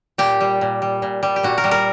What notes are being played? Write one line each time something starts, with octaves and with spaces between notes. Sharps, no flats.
A#2 G4
G3
A#2
G3
A#2
G3
G4
A#2 F#4
A#4
G3
A#4